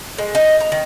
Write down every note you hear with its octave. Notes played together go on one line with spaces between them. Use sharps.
G#3
D#4
A#5
D#3